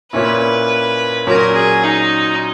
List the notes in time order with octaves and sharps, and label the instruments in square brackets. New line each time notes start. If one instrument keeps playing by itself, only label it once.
[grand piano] A#2 A#3 C#4 E4 [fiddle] B4
[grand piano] A#2 F#3 C#4 [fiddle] A#4
[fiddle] G#4
D#4